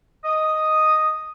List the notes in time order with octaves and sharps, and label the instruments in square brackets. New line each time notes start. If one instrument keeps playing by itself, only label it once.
[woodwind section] D#5 D#6